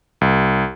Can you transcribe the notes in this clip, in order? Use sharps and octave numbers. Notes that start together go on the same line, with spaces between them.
C2